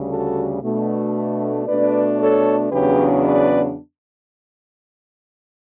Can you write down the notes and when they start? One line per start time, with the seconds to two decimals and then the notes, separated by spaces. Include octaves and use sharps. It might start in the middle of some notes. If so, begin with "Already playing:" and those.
Already playing: D2 C#3 G3
0.09 F#4 A4
0.61 B2 A3 D4
1.67 B2 A3 D4 B4 D5
2.19 A4 C#5
2.71 E2 C#3 F#3 B3 D4 G4 B4
3.24 B4 D5